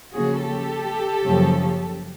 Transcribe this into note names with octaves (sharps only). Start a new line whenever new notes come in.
C#3 F3 A#3 C#4 F#4 G#4
G4 A4
F#2 C#3 F3 A#3 C#4